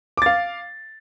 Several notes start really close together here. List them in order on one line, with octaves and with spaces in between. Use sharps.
D6 A6 F5